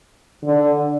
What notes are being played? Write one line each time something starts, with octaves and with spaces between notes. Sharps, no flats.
D3